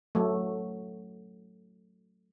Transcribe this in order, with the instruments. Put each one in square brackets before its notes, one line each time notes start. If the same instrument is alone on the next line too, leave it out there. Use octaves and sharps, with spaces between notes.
[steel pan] F#3 A3